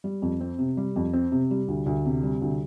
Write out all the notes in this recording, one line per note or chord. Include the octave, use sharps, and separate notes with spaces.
G3
F2
C4
C3
G3
F2
C4
C3
G3
D2
D2
C3
G3
D2